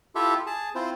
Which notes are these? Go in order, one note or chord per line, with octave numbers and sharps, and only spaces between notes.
E4 F4 G4 A4 E5
G#4 A5
C4 E4 F4 C5